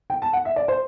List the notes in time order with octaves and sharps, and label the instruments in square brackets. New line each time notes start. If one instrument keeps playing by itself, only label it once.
[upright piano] G5
A5
F#5
E5
D5
C5